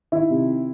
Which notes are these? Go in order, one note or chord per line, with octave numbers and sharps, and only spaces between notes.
D#3 E4
C3